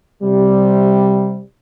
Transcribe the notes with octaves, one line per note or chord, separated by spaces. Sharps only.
C3 G3